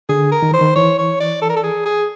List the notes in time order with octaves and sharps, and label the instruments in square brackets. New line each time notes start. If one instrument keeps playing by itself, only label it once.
[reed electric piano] D3 [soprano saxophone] G#4
[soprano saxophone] A#4
[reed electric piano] D#3
[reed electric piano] E3 [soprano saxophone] C5
[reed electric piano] D#3
[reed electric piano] E3 [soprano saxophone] C#5
[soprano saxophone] C#5
D5
A4
A#4
A4
G#4
G#4